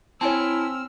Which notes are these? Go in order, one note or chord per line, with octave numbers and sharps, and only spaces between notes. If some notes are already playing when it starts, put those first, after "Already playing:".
C4 E4 C#5 G#5 A5 E6 F6